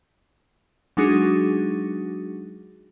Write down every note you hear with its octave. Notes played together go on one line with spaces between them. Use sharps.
F#3 G#3 D4 D#4 F#4 G#4